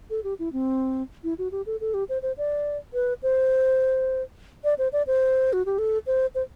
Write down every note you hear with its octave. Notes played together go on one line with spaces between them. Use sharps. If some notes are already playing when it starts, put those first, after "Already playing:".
A4
G4
E4
C4
E4
F#4
G4
A4
A4
G4
C5
C5
D5
B4
C5
D5
C5
D5
C5
F#4
G4
A4
C5
C5